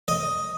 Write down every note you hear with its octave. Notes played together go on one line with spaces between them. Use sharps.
D#5